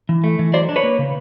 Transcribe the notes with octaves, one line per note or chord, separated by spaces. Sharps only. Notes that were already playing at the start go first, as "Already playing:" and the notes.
E3
A3
E3
F#3 C5 D5
D4
B4 C#5
A#3
C#3